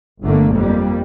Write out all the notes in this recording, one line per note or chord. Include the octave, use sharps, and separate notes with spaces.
G1 D3 A3 A#3
F2 G3 A#3